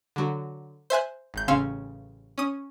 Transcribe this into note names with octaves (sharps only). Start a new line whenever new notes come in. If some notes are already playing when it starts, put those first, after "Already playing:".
D3 F#3
C5 E5 G#5 F#6
G#1 G6
A1 C#3 C#4 F5 C6 E6
C#4 D#6